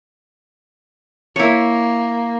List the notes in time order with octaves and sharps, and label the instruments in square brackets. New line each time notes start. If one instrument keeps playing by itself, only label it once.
[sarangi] A#3 [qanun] E4 C#5